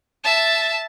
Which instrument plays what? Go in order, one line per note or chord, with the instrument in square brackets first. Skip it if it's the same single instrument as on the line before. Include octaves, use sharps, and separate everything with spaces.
[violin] E5 A5